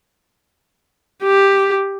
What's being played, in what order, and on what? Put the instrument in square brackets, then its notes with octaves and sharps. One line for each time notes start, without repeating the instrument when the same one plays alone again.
[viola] G4